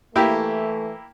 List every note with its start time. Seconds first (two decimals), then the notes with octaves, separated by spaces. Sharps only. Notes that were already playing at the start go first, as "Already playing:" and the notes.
0.16 E3 A3 A#3 E4 G4